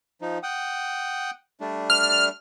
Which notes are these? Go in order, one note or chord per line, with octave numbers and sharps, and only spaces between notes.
F3 D#4
F#5 G5 D#6
G3 A3 D4
F6